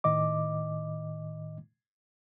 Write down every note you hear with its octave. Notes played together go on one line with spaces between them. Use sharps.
A2 D#3 D#5 D6